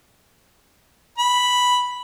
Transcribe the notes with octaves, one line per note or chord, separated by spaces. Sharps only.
B5